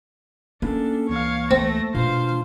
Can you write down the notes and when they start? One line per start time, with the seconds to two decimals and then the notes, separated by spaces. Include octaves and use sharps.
0.62 A#3 B3 C#4 D4 A4
1.09 C#2 E3 C#5 F5
1.51 A3 C4 A#6
1.95 B2 D4 F4 C5 F5